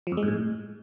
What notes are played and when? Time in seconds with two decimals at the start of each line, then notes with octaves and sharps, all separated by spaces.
0.07 F3
0.12 F2
0.17 G#3
0.23 G#2
0.28 A2